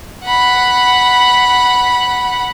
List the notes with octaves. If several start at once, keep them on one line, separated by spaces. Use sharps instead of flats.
F#5 B5